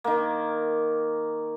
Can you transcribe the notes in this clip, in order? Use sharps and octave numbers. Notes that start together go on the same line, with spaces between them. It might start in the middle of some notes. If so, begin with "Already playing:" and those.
D#3 A#3